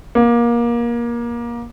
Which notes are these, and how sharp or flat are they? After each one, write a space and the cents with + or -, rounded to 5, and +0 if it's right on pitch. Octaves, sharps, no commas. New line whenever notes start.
A#3 +25